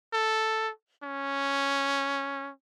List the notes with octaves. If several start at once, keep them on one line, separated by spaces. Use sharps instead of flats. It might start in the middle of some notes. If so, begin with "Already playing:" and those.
A4
C#4